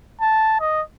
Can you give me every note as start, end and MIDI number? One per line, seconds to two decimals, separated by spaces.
0.21 0.58 81
0.60 0.82 75